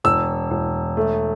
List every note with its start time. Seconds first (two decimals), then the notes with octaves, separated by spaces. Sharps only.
0.04 E1 E6
0.51 E1
0.97 A3